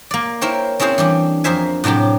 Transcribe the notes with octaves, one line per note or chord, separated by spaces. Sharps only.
A#3 D5
E4 A#4 C5 C#5 G5
C4 C#4 E4 G#4 C5
E3 G3 D4
F2 A#4 C5 E5 G#5
A2 C3 F#3 D4 G4